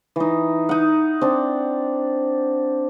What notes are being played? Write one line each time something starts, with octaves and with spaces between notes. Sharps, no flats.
E3 D#4
D#4 F#5
C4 D4